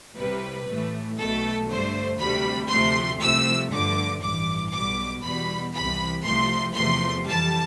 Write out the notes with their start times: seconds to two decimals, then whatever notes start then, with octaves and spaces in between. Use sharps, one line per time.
0.18 C2 C3 G3 B4
0.68 A1 A2 E3 A3
1.19 B1 B2 A3 A4
1.70 G2 D3 A3 C5
2.20 D2 C3 G3 B5
2.71 D2 C3 F3 A3 C6
3.21 C2 C3 F3 A3 E6
3.72 G2 D3 F3 A3 D6
4.23 A1 G2 E3 D6
4.73 B1 B2 G3 D6
5.24 E2 B2 G3 B5
5.74 C2 C3 E3 B5
6.25 C2 C3 F3 A3 C6
6.76 E2 C3 F3 A3 C6
7.27 F2 E3 G3 A5